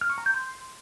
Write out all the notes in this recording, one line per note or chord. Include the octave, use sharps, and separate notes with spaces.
F6
C#6
A#5
G6
C6